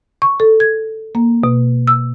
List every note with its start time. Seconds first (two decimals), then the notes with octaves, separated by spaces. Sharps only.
0.22 C#6
0.40 A4
0.60 G#6
1.15 A#3
1.44 B2
1.87 E6